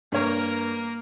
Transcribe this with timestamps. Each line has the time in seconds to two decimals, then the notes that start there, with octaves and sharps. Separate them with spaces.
0.12 G2 A#3 A#4 C#5